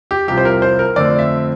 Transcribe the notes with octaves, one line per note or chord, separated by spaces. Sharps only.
G4
C2 C3 F3 G4
C5
A#4
C5
A#4
F2 D3 A3 C4 D5
E5